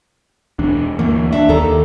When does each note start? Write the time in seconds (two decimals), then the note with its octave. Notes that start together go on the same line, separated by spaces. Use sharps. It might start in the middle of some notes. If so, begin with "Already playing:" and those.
0.59 E1 E2 D4
0.99 D2 E3 A3 A#3
1.32 E2 D4 E5
1.49 D#2 D#3 A4 A#5